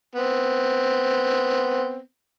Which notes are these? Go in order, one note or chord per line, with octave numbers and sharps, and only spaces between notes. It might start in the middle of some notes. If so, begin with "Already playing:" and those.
B3 C4